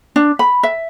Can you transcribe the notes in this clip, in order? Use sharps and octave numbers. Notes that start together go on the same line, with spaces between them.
D4
B5
E5